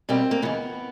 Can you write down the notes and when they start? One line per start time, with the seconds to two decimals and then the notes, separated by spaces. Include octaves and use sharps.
0.09 B2 G3 A#3 C4
0.31 A#3
0.42 D#2 C#3 E3 B3